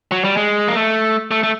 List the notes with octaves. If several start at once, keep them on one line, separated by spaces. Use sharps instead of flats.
F#3
G3
G#3
A#3
A3
A3
A3